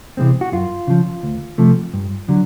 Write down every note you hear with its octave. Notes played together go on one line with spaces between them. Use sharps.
C3 E3 G#3 C4
F#4
F#2 F4
C#3 F3
D2
C3 F3 A3
G2
D3 F#3